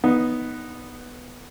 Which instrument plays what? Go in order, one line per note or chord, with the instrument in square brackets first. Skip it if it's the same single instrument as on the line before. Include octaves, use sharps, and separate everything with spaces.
[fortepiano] B3 D#4